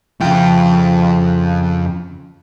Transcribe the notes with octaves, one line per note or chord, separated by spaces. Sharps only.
F2 C#3 F3 E4 G5